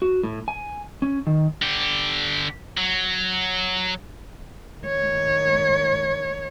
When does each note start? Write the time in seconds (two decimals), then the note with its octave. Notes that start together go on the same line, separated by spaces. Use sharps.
0.02 F#4
0.23 A2
0.48 G#5
1.02 C#4
1.27 D#3
1.62 D3 G4
2.78 F#3
4.82 D#3 C#5